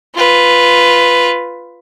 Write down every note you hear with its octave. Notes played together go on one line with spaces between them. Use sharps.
F4 B4